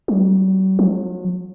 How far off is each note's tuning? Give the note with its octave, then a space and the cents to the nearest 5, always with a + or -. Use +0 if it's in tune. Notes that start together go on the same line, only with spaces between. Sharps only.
F#3 +45
F#3 -40